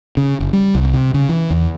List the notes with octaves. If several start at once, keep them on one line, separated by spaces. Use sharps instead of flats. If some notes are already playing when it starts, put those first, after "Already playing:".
C#3
F#1
G3
C2
C3
C#3
E3
E2